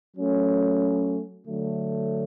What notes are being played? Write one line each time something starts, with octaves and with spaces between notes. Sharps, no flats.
F#3 A3 C#4
D3 F#3 A3